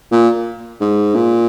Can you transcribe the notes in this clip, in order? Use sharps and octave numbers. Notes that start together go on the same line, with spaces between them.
A#2
G#2
A#2